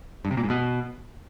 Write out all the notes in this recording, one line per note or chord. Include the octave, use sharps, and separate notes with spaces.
G2
C3
A#2
G#2
B2